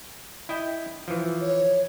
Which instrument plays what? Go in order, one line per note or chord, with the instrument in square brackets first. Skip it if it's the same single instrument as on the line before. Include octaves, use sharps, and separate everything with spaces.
[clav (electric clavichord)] E4 D#5 G5
E3 F3
[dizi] C#5